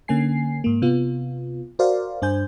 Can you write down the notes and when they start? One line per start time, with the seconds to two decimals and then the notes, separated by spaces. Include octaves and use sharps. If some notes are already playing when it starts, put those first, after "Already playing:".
0.08 D3 A#3 C#4 G#5 C7
0.64 G#2 A#3
0.82 C3 B3 F4
1.79 F#4 A#4 C5 D5 F5
2.22 G2 D4 C5 G#5 G6